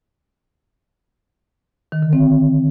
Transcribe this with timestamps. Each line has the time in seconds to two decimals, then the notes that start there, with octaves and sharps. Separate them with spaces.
1.92 D#3
2.02 D3
2.13 C4